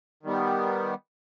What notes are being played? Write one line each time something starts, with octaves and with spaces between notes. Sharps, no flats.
D#3 G3 B3